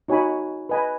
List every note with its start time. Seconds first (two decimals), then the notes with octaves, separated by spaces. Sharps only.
0.08 D#4 F#4 C#5 G#5 B5
0.69 B4 D#5 G#5 B5